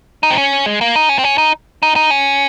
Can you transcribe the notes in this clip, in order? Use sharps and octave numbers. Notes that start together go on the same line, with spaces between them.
D#4
C4
C#4
G#3
A#3
D#4
C#4
C4
C#4
D#4
D#4
D#4
C#4